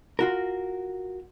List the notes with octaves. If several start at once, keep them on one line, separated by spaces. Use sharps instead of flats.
F4 F#4 A#4